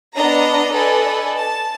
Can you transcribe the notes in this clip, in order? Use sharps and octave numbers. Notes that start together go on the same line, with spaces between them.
B3 D4 D#5 A#5
A4 B4 D5 D#5 G#5
A5